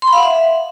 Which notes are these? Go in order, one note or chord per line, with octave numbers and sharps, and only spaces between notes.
C6
B5
F5
F#5
E5